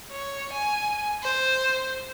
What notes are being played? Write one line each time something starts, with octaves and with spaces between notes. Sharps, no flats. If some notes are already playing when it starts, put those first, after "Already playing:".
C#5
G#5
C5